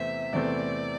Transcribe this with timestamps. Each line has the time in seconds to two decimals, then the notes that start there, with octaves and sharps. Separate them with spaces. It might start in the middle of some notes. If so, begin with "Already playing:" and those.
Already playing: E2 C3 E3 A3 C4 E5
0.33 E2 C3 E3 A3 C4 D5